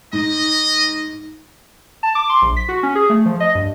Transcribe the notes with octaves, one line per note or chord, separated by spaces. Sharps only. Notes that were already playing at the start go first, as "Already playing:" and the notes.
G#2 D#5
A5
D6
C6
A#1
B6
F#4
C#4
G#4
A3
F3
D#5
G2